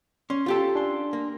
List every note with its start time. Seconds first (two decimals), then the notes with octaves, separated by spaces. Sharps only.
0.30 C#4 C6
0.46 F4 G4 A4
0.75 D4 G#5 C6
1.13 A#3